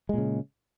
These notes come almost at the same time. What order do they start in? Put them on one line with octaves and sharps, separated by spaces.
G#3 A#2 C#3